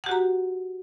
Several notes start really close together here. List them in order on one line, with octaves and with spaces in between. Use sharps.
F#5 G4 F#4 A#5